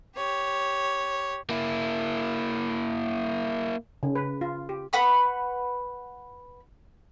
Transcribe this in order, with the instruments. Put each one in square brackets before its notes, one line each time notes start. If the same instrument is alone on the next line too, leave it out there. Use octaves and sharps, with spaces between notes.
[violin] G4 C#5
[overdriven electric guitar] A#3 E4
[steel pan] C#3
B4
F4
G4
[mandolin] B4 F#5 B5 C#6